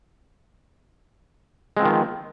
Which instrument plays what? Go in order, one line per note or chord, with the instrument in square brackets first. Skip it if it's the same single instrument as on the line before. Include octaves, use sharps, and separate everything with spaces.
[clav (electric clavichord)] G#3
C4
F3
D#3
B3